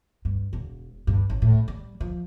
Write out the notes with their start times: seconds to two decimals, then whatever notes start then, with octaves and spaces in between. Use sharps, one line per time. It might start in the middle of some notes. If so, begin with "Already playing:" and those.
0.25 G2
0.53 E1
1.07 G2
1.30 A1
1.42 A2
1.68 G3
2.00 F3